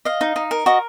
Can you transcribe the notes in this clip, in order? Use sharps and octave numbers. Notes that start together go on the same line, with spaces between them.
D#5 F5
D#4
D#4
A#4
F#4 D#5